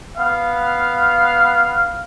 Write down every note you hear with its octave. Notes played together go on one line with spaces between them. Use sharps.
B3 F5